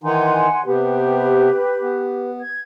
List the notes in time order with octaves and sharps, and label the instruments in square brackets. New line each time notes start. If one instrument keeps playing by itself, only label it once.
[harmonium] D#3 E3 D#4 [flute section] F#5 G#5 C6
[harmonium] C3 B3 [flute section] G4 B4
[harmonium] B3
[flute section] G#6